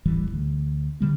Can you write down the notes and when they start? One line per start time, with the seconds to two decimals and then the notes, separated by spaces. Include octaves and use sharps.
0.05 D#1 A1 E3 G3
0.32 D2
1.00 A#2 D3 G3 A#3